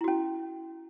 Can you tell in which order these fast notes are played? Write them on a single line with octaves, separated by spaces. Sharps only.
E4 F#4 C#4